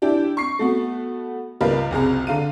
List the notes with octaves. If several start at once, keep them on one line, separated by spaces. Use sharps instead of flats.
D4 E4 G4
C#6 C7
A3 B3 F#4
C#2 G3 A#4 B4 F5
F#1 C2 G#4 A#5
D3 F5 D#7